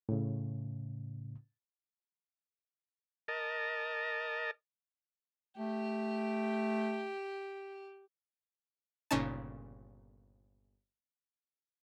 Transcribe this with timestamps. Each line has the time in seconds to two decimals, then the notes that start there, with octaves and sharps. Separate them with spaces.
0.09 A2 C#3
3.28 A#4 D#5 A5
5.58 A3 G4
9.11 G1 A#2 C#3 C#4 D#4 A5